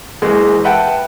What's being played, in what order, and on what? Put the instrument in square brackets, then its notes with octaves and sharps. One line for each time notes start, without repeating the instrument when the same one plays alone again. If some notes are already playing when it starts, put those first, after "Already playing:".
[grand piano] F#1 E2 G#3
B4 E5 F#5 G5 A5